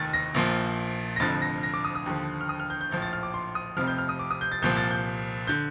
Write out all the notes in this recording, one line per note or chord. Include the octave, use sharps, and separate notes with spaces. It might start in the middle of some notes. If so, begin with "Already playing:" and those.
Already playing: F1 D#2 D#3 A6
A#6
A#1 A#2 F3
A#6
F1 F2 D3 F3 A6
A#6
A#6
D6
D#6
D#6
D#2 D3 F3
F6
D#6
F6
G6
G6
A#1 A2 F3 G6
A6
F6
D6
C6
D#6
F1 F2 C3 F3 F6
G6
F6
D#6
D6
D#6
G6
A6
C2 A#2 F3 G6
A6
G6
D3 G6